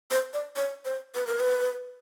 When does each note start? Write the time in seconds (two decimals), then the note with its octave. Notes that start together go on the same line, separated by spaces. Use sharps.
0.11 C5
0.34 D5
0.56 C#5
0.85 C5
1.15 B4
1.27 A#4
1.40 B4